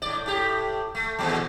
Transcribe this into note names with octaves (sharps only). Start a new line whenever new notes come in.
A2 D5
A2 G4
A3
E2 A#2 F#3